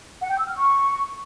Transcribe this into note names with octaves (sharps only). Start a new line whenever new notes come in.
F#5
G5
E6
F6
C#6